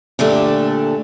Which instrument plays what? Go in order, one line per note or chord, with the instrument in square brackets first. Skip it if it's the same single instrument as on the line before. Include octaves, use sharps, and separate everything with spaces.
[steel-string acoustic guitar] A#2 D3 A3 D4 G4